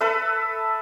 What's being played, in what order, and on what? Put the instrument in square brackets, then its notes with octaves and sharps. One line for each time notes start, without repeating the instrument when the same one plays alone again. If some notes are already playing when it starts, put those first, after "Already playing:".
[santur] A4 B4 E5